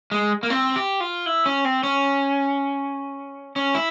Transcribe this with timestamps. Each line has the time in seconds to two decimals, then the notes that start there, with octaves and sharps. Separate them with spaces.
0.11 G#3
0.43 A#3
0.50 C4
0.76 G4
1.00 F4
1.26 E4
1.46 C#4
1.65 C4
1.83 C#4
3.56 C#4
3.75 E4